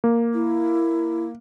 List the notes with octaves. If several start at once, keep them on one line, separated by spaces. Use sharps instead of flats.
A#3
E4